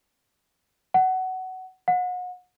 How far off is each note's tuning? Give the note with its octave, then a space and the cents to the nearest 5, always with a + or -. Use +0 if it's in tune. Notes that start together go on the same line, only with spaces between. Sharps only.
F#5 +15
F#5 -35